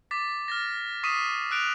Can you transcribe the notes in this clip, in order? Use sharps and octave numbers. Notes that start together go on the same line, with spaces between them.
D6 A6 B6
F6 A6 A#6
C#6 D#6 B6 C7 D#7 E7
E6 F#6 D7 F7